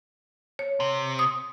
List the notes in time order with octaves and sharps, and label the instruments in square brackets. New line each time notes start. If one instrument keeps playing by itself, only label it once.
[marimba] C#5
[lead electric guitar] C3
[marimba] D#6